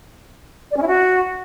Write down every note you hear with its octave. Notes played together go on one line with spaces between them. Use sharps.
D5
C#4
E4
F#4